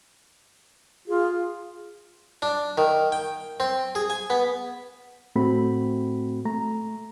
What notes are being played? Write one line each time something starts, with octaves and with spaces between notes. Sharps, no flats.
F4 G#4
D4
D#3
G5
C4
G#4
G#5
B3
A2 A3 C4 F#4 B5
A3 A#5